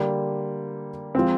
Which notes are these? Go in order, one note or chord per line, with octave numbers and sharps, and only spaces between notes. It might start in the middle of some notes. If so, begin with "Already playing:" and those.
Already playing: D3 G3 A#3
F3 G#3 C4